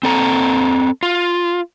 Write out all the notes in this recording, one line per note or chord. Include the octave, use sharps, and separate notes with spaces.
C4 A4 A#5
F4